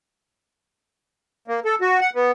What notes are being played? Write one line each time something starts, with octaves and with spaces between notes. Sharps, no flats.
A#3
A4
F#4
F#5
B3